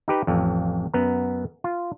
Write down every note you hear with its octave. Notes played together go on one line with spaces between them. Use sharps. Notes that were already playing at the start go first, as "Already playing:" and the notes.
D#4 G4 B4
A1 F2
F#2 B3 A#5
F4